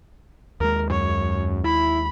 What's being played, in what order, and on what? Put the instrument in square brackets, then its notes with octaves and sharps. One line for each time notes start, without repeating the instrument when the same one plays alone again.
[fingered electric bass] D#2 G#3 [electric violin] A#4
[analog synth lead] F#2 [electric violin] C#5
[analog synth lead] E4 [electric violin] B5